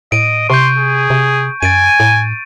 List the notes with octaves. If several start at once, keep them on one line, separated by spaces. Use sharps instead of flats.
A2 D#5 D7 D#7
C3 C6 C#6 G6
G#4
C3
F#2 G#5 A6 D7 D#7
A2